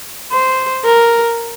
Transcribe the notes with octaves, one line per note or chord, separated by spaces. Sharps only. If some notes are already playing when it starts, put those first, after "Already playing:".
C5
A#4